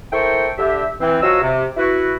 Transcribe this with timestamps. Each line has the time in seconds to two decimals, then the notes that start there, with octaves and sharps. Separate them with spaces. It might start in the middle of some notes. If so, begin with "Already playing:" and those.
0.13 E4 A4 A#4 C5 G5 C#6
0.58 D3 G4 E5
1.00 E3 C4
1.23 F3 F#3 F#4 D#5 F5 E6
1.42 C3
1.77 E4 F#4 B4